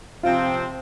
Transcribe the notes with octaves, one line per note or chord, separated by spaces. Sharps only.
C3 F3 C4 F4